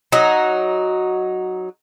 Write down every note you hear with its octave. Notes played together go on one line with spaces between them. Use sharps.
F#3 D#4